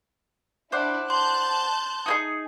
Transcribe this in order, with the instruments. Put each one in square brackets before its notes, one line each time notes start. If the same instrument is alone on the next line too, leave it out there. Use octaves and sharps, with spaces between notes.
[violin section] D4 E4 [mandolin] C5 D5 F#5
[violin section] A5 F#6 G6 [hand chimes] C6
[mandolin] D#4 E4 G#4